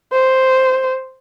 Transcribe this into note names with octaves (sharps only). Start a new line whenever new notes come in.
C5